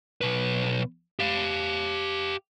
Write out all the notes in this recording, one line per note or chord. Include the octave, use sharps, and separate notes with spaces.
B1 B4
G4 F5